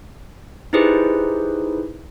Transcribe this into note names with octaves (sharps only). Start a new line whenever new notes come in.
D#4 E4 G4 G#4 B4 C5